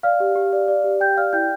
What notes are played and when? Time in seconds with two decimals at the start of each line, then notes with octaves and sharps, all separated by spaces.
0.03 D5 F5 F6
0.20 G4
0.36 G4
0.53 D5
0.68 D5
0.84 G4
1.01 G4 G5 G6
1.17 D5 F5 F6
1.33 E4 G5 G6